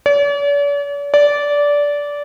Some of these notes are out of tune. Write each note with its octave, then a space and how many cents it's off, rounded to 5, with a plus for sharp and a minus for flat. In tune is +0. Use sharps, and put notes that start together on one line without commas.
D5 -45
D5 -15